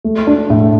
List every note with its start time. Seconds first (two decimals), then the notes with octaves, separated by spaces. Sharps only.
0.04 A3
0.27 D4
0.50 A2